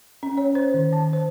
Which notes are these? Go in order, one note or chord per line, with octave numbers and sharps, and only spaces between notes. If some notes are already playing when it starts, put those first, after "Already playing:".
C#4
C#5
C5
D#3
A5
C5